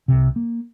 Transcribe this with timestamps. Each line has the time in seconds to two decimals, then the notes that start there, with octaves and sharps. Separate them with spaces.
0.08 C2 C3
0.36 A#3